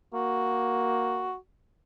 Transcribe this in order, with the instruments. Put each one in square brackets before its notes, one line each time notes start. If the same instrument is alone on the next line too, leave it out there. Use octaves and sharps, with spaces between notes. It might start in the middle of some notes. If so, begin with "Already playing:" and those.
[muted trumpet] A#3 [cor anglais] F#4